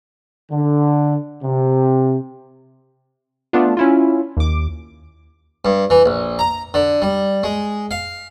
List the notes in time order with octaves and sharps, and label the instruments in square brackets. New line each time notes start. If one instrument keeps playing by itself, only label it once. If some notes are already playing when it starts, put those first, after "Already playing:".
[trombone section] D3
C3
[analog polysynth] A3 B3 D4 F4
C#4 E4 F4
D#2 D6
[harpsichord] G2
E3
A#1
A#5
D3
G3
G#3
F5